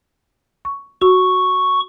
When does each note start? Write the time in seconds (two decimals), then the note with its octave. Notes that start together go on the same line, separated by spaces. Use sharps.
0.65 C#6
1.01 F#4 C#6